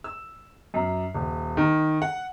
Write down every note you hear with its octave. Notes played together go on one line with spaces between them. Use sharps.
E6
F#2
D#1
D#3
F#5